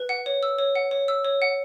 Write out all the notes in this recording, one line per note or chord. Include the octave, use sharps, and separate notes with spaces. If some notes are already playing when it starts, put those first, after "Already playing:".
Already playing: B4
F#5
C#5
E6
C#5
F#5
C#5
E6
C#5
F#5